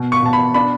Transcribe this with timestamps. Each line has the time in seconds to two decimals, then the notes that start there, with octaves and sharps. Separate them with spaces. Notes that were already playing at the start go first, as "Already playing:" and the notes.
Already playing: B2
0.12 C#6
0.23 B2 A5
0.33 B5
0.54 D4 B5